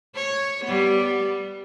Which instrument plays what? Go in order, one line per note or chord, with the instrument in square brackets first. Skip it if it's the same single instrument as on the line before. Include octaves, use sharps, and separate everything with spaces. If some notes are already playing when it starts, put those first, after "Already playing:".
[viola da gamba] C#5
G3 B3